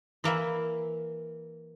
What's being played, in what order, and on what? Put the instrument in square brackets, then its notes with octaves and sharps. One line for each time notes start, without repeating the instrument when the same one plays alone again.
[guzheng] E3 A#3 E5 B5